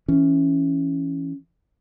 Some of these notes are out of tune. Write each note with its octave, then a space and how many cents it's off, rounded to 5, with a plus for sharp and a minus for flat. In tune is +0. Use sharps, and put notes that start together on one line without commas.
E3 +0 C#4 +0